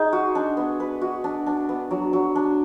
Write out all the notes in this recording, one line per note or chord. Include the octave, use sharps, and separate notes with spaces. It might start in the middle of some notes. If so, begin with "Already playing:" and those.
Already playing: D#4 G#4 C5
F#4
D4
B3
B4
F#4
D4
D4
B3
F#3
F#3
D4